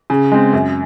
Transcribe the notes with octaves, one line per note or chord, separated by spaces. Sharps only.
C#3
G#3 C4
F#2